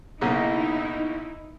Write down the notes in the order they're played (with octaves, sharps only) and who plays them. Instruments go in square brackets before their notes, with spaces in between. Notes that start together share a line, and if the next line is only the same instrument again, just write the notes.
[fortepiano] B1 C#3 A#3 [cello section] D#4 E4